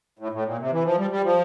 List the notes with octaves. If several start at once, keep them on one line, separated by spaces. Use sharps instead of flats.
A2
A2
A#2
C3
E3
F3
G3
G3
F3